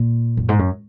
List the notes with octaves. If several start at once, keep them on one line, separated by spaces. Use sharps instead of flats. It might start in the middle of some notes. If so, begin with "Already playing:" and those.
Already playing: A#2
F#2
G#2
F#2